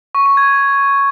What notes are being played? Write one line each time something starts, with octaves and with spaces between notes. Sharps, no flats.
C#6
C#6
G#6